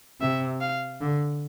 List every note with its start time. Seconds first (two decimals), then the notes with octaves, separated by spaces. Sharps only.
0.21 C3 E5
0.61 F5
1.01 D3